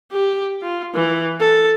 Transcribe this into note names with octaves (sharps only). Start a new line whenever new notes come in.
G4
F4
E3
A4